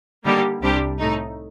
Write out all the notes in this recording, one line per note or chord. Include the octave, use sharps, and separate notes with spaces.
D3 G3 A#3 D#4 G4
C2 C3 G3 D4 G4
A2 A3 D#4